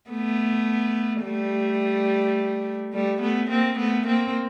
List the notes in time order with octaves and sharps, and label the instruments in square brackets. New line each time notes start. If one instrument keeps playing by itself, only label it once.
[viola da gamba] A3 B3
G3 A3
G3 A3
A3 B3
A#3 C4
A3 B3
A#3 C4